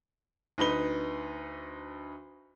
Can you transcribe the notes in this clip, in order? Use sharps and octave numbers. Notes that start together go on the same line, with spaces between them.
D2 D#4 B4 G7